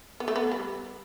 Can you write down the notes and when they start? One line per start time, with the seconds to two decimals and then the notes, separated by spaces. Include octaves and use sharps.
0.20 B3
0.28 A3
0.36 B3
0.52 G3